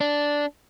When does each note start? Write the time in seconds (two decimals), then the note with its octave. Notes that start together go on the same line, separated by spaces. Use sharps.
0.01 D4